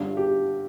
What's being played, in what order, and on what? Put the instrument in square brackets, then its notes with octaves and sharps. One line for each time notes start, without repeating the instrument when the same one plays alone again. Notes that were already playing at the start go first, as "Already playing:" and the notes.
Already playing: [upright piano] G1 G2 D3
G4